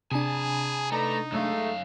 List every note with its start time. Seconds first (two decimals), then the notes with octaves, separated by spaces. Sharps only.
0.12 C3 D4 G#4 G#5 A5
0.92 A3 D#4 B4 D5 A#5
1.32 F#2 G#3 A3 F5